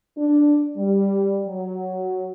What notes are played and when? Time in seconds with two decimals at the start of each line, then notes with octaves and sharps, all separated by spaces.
0.17 D4
0.76 G3
1.47 F#3